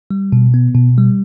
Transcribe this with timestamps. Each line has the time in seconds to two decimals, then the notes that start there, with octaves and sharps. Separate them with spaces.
0.11 G3
0.32 B2
0.54 B3
0.75 B2
0.98 G3